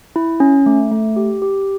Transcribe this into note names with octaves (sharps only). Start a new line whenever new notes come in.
E4
C#4
A3
A3
G4
G4